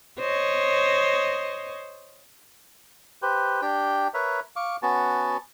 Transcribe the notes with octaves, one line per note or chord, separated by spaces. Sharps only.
C5 C#5 D#5
G4 B4 C5
D4 G4 G5
A#4 B4 C#5 E5
F5 C#6 D6
B3 C#4 F#4 A5